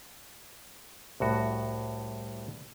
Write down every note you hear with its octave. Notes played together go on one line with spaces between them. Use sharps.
C2 A2 F#4